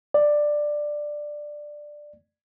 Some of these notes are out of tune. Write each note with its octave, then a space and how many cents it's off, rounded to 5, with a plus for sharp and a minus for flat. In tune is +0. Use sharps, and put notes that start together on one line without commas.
D5 +10